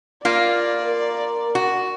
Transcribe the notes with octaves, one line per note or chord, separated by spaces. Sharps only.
A#3 F4 D5
A#4
F#4